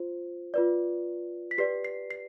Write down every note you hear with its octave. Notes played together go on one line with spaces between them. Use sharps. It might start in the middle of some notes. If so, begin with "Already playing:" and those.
Already playing: F4 C5
F4 B4 D5
B6
G4 B4 D5 C7
C7
C7